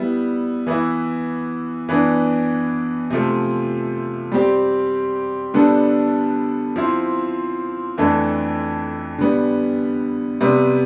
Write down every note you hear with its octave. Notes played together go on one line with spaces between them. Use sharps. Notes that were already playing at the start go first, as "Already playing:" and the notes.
Already playing: G3 B3 E4
E3 B3 E4
E3 B3 D4
C3 F3 A3
G3 C4 G4
D3 G3 B3 D4 A4
F3 C4 E4
F2 E3 A3 D4 A4
D3 G3 B3
C3 G3 B3